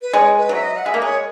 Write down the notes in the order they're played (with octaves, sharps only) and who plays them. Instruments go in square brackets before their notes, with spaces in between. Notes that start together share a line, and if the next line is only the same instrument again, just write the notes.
[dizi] B4
[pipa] G#3 [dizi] C#5
[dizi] B4
[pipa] F#3 [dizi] E5
[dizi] D#5
F#5
[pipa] G#3 [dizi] E5
[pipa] A#3
[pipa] G#3 [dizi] C#5